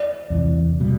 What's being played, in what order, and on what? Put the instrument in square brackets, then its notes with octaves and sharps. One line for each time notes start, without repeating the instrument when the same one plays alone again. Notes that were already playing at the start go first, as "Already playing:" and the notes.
Already playing: [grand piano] D5
[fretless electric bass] E2 C3 E3
B2 G3